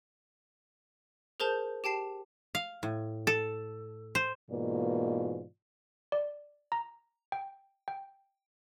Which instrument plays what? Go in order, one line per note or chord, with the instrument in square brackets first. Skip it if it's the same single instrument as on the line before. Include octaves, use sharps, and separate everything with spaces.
[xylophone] G#4 A#4 C5 A5 G6
G4 G5 A5 C7
[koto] F5
A2
A4
C5
[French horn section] G#2 B2 E3 A#3 F4 D5
[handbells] D5
A#5
G5
G5